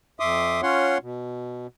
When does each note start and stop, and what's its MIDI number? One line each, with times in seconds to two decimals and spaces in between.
0.20 0.61 41
0.20 0.61 76
0.20 0.61 84
0.20 0.61 86
0.20 0.61 87
0.62 0.98 61
0.62 0.98 65
0.62 0.98 73
0.62 0.98 78
0.62 0.98 84
1.02 1.67 47